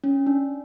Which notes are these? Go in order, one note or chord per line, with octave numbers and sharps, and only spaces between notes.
C#4
D4